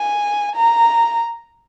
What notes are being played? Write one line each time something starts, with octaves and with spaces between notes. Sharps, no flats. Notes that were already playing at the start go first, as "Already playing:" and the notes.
Already playing: G#5
A#5